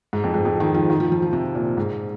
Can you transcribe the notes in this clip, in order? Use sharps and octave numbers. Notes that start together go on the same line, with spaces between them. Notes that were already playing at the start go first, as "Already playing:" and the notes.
G#2
F2
G#2
F2
D#3
F3
D#3
F3
F3
F3
C3
A#2
G#2